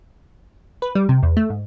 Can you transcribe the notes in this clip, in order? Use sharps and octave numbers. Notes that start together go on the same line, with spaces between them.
B4
G3
C3
E2
A3
G#2